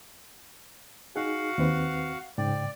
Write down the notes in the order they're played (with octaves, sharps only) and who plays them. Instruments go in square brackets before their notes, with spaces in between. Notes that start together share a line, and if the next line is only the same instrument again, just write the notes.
[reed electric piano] D#4 G#4 [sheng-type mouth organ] F#4 F5 F#5
[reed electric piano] D#2 C4 B4
[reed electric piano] G#2 C#3 G5 [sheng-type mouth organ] D5